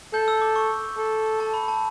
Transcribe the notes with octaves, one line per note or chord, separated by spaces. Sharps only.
A4 G6
E6
D6
C#6
A4
A5
B5
A5